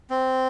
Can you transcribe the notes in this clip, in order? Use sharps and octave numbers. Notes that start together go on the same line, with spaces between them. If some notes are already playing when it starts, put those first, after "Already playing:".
C4